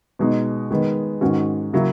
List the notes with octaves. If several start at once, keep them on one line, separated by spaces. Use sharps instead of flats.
B2 G#3 D#4
D#3 G#3 B3
G#2 D#3 G#3 C#4 F#4
C#3 F#3 A#3 E4